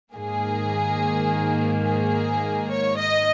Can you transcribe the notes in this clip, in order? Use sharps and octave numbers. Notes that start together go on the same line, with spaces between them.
G#2 D#3 A#3 G#4
G#4
C#5
D#5